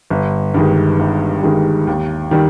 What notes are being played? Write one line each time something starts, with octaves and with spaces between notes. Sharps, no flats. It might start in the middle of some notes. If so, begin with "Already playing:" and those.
G1
G2 D#3 G#3
G1
G2 D#3 G#3
D#2
D#3 G3